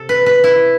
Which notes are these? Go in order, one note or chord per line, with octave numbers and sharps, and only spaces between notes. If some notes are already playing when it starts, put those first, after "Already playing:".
Already playing: C3 A4
B4
B4
E4